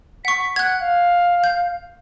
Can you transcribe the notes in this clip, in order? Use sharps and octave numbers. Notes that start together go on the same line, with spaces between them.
F#5 C#6 B6
F#5 F#6 G#6
F5
G6